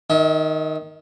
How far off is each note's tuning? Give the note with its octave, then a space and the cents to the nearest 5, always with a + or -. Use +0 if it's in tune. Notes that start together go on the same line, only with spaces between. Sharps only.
D#3 +0 E5 -45